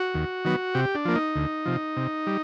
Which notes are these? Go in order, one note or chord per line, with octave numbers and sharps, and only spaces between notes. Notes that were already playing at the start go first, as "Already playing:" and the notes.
Already playing: F#4
D#2
D#3 F#3 B3
C3 G4
D4
F3 A#3
D#4
D2
C3 F3
C3
G3